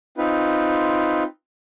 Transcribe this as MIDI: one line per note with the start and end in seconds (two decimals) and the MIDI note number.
0.18 1.23 60
0.18 1.23 63
0.18 1.23 65
0.18 1.23 71